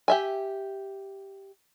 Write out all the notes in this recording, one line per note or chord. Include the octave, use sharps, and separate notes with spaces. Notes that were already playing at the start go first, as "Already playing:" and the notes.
G4 E5 G#5